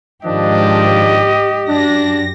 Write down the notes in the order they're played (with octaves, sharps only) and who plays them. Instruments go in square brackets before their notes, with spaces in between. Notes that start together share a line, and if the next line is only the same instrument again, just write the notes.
[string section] G#2 [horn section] D#3 F3 D4 [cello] G4 [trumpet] D#5
[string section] F#2 A#6 [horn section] D4